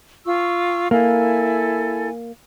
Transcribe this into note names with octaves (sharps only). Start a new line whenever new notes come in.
F4 C#6 E6
A#3 E4 A4 G#5